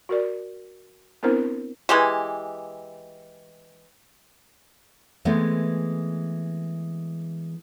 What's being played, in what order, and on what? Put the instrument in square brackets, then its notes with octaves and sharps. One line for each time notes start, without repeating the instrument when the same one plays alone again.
[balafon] F#4 A#4 D5
B3 C4 D4 E4 A#4 C5
[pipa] E3 G#3 G4
[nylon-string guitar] E3 G#3 A3 B3 C4